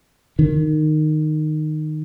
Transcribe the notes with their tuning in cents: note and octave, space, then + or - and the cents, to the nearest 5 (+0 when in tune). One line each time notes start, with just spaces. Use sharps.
D#3 -15